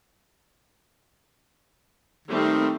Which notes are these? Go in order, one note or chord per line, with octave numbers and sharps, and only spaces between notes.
D#3 G3 A3 C4